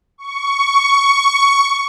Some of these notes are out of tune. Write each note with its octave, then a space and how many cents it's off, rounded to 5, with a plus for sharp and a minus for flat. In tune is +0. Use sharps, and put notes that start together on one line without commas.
C#6 +10